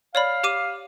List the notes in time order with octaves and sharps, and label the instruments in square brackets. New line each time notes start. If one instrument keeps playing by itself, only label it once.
[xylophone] C#5 D5 B5 [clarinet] F5
[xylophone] G4 D6 D#7